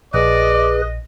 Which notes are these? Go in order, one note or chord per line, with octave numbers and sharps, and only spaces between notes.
A#1 G#4 B4 D5 D#5